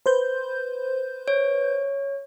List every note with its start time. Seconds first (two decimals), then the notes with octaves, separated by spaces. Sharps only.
0.06 B4 C5 G6
1.28 C#5